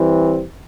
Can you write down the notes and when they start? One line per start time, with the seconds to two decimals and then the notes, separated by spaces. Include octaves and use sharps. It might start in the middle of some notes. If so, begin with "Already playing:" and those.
Already playing: E3 G3 C4